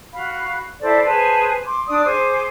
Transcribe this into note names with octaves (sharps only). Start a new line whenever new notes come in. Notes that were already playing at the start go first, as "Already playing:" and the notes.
F#4 F5 B5
E4 A4 C5 D5
G#4 B4 C5 A5
C6 D6
D4 D5 D#6
G#4 C5 C6 D6